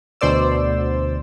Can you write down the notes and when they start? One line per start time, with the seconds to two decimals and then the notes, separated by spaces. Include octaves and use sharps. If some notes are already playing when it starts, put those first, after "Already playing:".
0.21 D2 B2 C5 D5 E6